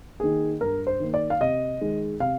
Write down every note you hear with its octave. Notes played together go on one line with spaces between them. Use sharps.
D#3 A#3 G#4
G2 A#4
C5
D#3 A#3
D5
F5
C3 D#5
D#3 G#3 D#4
C3 F5